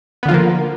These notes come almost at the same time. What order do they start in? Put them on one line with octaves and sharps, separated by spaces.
B3 D3 F4 F3 A#3